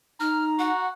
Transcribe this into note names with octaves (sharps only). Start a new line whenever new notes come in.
D#4 A#5 F6
F#4 F#5